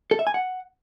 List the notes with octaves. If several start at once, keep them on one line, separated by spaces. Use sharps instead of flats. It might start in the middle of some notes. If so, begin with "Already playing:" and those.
A4
E5
G#5
F#5